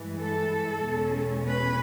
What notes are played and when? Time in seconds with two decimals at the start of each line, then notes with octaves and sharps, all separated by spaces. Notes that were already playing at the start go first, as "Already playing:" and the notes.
Already playing: G2 E3 G#3
0.21 A4
0.86 E2 B2 G#3 C#4
1.50 B4